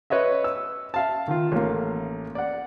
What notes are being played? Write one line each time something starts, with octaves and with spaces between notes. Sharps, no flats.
B4 C#5 D#5 E5
E6
E5 F5 A5
D#3 F4
A1 A#3
D5 F#5